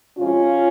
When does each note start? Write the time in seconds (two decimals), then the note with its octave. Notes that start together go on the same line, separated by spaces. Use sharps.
0.17 C3 F3 G#3 C#4 F4